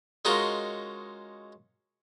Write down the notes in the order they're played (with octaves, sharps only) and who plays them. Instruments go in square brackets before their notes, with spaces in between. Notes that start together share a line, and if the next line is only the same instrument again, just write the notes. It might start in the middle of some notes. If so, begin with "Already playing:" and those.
[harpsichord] G#3 C#4 D#4 F4 F#4 A#4